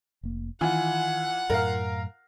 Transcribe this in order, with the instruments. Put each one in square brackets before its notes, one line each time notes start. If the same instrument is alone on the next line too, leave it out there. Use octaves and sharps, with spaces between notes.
[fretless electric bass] F1 A#3
[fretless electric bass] D#3 [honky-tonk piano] E3 [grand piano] F4 G#5 [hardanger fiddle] F#5
[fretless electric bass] F#2 A2 [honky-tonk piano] A#4 F5